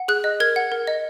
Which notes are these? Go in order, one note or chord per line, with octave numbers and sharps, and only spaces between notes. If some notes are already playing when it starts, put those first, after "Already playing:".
Already playing: F#5
G#4 F#6
D#5
A#4 G#6
F#5
A#4
D#5